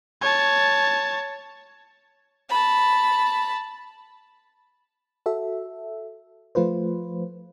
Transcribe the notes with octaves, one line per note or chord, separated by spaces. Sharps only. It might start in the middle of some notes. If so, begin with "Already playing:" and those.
C#5 A5
A5 B5
F#4 A4 E5
F3 A3 F4 B4 C5